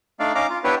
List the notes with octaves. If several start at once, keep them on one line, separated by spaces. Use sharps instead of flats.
A3 D4 D#4 D5 F5
C#4 D#4 F5 A#5 D6
F4
B3 D4 E4 G4 B4 C#5